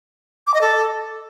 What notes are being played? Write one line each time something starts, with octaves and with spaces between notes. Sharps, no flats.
D6
D#5
A4